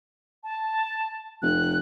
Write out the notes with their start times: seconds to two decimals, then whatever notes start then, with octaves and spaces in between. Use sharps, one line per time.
0.44 A5
1.42 F1 F#6